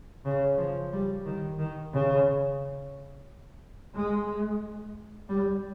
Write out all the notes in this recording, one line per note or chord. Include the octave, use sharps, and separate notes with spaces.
C#3
F3
G3
D#3
D#3
C#3
G#3
G3